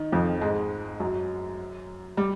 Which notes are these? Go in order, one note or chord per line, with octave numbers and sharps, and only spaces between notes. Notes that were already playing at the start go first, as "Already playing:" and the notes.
Already playing: D#3
F2 F3
G#2 G#3
F#2 F#3
G3